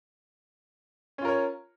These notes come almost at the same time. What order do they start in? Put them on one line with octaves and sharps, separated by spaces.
C#4 F4 A#4 C#5